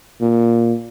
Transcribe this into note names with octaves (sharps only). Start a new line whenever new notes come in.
A#2